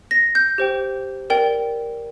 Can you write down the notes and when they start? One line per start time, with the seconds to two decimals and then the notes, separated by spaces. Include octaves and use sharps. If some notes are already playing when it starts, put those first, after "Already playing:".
0.11 A#6
0.35 G6
0.58 G4 C5 G5
1.30 A#4 D5 G5